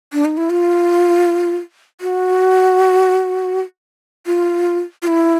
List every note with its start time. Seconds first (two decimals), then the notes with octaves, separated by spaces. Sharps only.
0.13 D4
0.25 D#4
0.37 E4
0.50 F4
2.01 F#4
4.26 F4
5.02 F4
5.07 E4